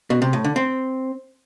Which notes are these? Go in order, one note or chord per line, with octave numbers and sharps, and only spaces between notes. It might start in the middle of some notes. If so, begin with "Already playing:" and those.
B2
C3
A2
D3
C4